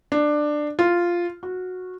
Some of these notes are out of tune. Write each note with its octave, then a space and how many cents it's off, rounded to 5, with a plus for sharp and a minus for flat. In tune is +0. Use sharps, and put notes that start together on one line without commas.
D4 +15
F4 -5
F#4 -15